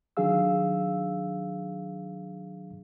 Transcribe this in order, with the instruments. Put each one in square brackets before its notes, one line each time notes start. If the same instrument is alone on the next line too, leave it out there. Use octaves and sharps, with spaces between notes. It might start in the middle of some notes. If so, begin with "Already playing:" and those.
[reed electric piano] D#3 F#3 D4 G#4 F5 E6